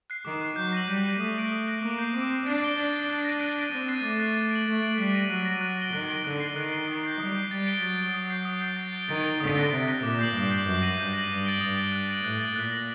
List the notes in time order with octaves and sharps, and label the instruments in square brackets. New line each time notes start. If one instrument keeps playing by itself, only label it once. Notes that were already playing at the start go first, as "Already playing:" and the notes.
[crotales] F#6 C7
[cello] D#3 [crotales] D6
[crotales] F#6 C7
[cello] F#3 [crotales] G6
[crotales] A#6 D#7 F#7
[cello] G3 [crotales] G6
[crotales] A#6 D#7 F#7
[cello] A3 [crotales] D#6
[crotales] F#6 A#6 D7
D#6
F#6 A#6 D7
[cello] A#3 [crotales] D6
[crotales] G6 C7
[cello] C4 [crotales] D6
[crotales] G6 C7
[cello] D4 [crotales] A6
[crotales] D7 G7
[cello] D4 [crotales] A6
[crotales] D7 G7
F#6
A#6 D#7
F#6
A#6 D#7
[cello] C4 [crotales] D6
[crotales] F#6 A6 C7 D#7
[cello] A3 [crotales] D6
[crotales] F#6 A6 C7 D#7
A6
D7 F#7
[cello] A3 [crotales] A6
[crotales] D7 F#7
[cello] G3 [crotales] F#6
[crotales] A#6 D#7
[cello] F#3 [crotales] F#6
[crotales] A#6 D#7
F#6
A#6 D7 G7
[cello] D#3 [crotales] F#6
[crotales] A#6 D7 G7
[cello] D3 [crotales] F#6
[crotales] C7 G7
[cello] D#3 [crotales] F#6
[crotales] C7 G7
D#6
G6 C7
[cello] G3 [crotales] D#6
[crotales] G6 C7
[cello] G3 [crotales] A6
[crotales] D7 G7
[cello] F#3 [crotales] A6
[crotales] D7 G7
D#6
G6 C7
D#6
G6 C7
A6
D7 G7
[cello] D#3 [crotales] A6
[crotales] D7 G7
[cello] D3 [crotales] D#6
[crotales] F#6 A#6 D7 G7
[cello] C3 [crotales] D#6
[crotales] F#6 A#6 D7 G7
[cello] A#2 [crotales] D6
[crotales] G6 C7 F#7
[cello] G2 [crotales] D6
[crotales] G6 C7 F#7
[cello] F#2 [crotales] G6
[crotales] A#6 D#7 F#7
[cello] G2 [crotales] G6
[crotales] A#6 D#7 F#7
[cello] G2 [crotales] D#6
[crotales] A6 D7 G7
[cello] G2 [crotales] D#6
[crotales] A6 D7 G7
F#6
A6 D7 F#7
[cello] A2 [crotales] F#6
[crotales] A6 D7 F#7
[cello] A#2 [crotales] F#6
[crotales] A#6 F#7